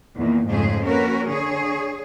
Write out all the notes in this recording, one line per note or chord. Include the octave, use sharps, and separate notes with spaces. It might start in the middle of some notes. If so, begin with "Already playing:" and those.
E2 A#2 D#3
F2 G#2 C#3 A3 G#4 C5
A#3 C#4 F#4 A#4 B4
D3 G#4 C#5